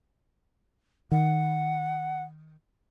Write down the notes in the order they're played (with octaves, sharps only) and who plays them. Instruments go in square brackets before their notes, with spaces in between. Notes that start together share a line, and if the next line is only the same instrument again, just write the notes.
[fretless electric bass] D#3 [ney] F#5